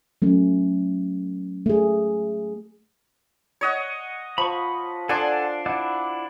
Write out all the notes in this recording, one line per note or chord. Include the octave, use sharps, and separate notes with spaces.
F#3 A3 C#4
A3 G#4
C#5 D#5 F#5
F3 B5 C#6
D4 A4 F#5 G#5 C6 D6
E4 D5 F#5